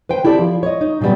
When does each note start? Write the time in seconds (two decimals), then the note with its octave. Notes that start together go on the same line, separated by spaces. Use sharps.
0.09 B4 C5 G5
0.24 C4 E4 G4 A4 D5
0.39 F3
0.63 C#5 D#5
0.81 D#4
1.01 A#2 C#3 F#3 G3 B3